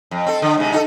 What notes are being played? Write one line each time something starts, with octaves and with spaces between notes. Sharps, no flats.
F2
C4 A4
D3
G#2 C3
D#4 F#4 A4